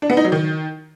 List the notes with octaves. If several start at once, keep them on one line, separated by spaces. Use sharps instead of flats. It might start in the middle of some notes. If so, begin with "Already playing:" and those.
D4
B3
D#4
F#3
D#3